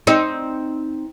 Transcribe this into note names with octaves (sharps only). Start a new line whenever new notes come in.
C4 D#4